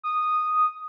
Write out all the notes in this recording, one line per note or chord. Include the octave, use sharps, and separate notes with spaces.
D#6